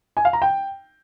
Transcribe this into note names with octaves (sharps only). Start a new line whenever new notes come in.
G#5
F5
A#5
G5